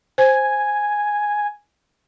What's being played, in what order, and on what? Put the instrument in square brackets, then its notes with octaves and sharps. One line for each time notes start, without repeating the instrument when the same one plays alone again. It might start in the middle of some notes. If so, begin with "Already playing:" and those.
[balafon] C5 [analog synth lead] G#5